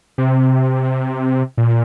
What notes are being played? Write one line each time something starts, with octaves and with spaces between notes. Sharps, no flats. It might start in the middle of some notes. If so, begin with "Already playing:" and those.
C3
A#2